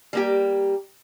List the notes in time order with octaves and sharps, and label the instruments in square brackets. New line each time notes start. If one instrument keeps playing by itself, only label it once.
[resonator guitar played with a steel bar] G3 A#3 G4